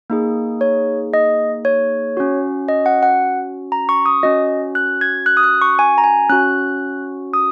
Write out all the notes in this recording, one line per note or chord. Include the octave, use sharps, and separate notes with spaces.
A#3 D#4 G#4
C#5
D#5
C#5
C#4 F#4
D#5
F#5
F#5
A#5
C#6
D#6
C#4 F#4 D#5
F#6
G#6
F#6
D#6
F#6
C#6
G#5
A#5
G#5
C#4 F#4 F#6
D#6